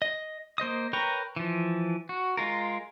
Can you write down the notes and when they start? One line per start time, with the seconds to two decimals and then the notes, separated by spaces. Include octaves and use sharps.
0.02 D#5
0.58 A#3 C5 D#5 D#6
0.93 A#4 B4 C#5 G5 A#5
1.36 E3 F3
2.09 F#4
2.37 G#3 F4 A#4